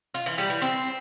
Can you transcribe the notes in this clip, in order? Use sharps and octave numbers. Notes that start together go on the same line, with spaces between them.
F4
E3
G3
E3
C4